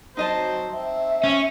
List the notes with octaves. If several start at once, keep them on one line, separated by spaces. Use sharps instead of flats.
F#3 C4 D#4 C5 D#5 A5
C4 E5
C#4